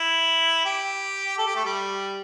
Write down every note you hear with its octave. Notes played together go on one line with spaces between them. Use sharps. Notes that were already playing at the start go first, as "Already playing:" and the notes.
Already playing: E4
G4
A4
G4
A3
G3